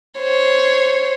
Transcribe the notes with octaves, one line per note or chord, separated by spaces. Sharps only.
C5 C#5